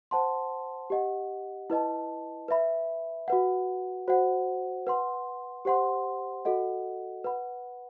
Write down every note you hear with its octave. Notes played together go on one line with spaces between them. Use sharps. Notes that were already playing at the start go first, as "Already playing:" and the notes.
C5 F#5 A5 C6
G4 D#5 F#5
E4 B4 D#5 A5
B4 E5 B5
F#4 B4 F#5
F#4 C5 F#5
B4 F#5 C6
G4 C5 F#5 C6
F#4 A4 D#5 F#5
B4 F#5 B5